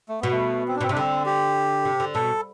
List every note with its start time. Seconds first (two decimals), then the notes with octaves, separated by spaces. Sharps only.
0.09 A3
0.21 B2 B3
0.31 A3
0.68 C4
0.76 D4
0.81 B2 C4
0.89 C3 D4
0.97 D3 C4
1.26 G4
1.85 C3
2.00 D3
2.15 B2 A4